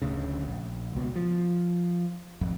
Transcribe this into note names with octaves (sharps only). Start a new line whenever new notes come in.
D1 D2 C#3
A#1
C#2 B2
F3
G#1 F2